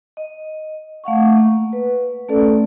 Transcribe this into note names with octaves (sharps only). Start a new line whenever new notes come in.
D#5
A3 F5 F#5 C#6
A#3
B4
A3 C#4 A4 D5